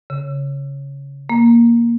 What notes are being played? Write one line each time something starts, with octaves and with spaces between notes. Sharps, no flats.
C#3
A#3